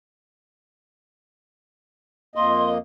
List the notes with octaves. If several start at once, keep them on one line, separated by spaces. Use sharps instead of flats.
F2 A#3 D#5 C6